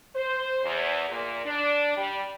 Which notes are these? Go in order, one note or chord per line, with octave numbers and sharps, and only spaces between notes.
C5
E2
A#2
D4
G3